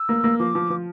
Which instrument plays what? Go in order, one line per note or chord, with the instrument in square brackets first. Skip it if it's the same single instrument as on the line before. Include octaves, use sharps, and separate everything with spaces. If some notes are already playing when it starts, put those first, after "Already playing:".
Already playing: [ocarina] E6
[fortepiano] A#3
A#3
[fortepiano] F3 [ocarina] D6
[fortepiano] F3
F3